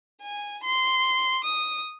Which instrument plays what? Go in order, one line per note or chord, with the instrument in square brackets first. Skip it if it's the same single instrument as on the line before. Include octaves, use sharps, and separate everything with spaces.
[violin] G#5
C6
D#6